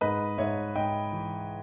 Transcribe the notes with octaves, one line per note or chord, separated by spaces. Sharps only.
G#2 B4 D#5
G#2 C#5 E5
G#2 D#5 G5
E3